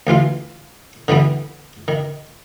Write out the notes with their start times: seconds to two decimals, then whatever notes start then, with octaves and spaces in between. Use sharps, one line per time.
0.07 D2 E3 F4 F5
1.08 D3 E3 G3 B3
1.88 D#3